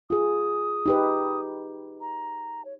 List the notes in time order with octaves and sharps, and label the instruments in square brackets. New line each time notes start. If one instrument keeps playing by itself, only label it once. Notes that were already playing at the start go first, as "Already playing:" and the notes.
[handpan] F4 G#4 [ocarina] D#6
[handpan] D#4 G4 B4
[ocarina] A#5
C#5